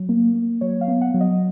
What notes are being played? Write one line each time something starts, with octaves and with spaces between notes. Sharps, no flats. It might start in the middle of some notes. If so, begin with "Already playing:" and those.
Already playing: F#3
A#3
A#3
F#3 C#5
F5
B3
F#5
F#3
D#5